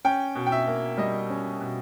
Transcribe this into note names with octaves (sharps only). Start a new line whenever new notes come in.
C#4 G5
B2
G5
E5
A#3
G3 D#5
C#4
B2